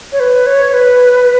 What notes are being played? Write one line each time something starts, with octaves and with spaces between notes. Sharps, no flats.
C#5
B4
C#5
B4